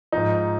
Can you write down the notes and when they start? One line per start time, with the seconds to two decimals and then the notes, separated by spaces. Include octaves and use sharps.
0.12 G#2 F3 D#4